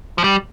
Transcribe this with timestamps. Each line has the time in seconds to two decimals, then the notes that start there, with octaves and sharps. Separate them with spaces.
0.18 F3
0.24 G3